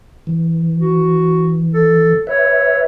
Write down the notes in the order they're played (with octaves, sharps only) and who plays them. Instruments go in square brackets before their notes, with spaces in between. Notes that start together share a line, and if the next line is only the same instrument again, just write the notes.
[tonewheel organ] E3
[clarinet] F#4
A4
[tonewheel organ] B4 E5 [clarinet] C#5